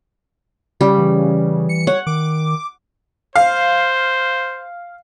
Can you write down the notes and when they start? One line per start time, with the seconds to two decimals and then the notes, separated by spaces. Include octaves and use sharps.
0.81 C#3 G3
0.99 E3
1.69 C#7
1.87 C#5 F#5
2.07 D#3 D6
3.36 C5 F5